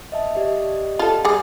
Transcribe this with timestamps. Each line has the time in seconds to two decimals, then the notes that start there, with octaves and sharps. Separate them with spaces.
0.12 D#5 E5 A5
0.35 G4 D5 D#5
0.99 F4 A4
1.25 G3 G#4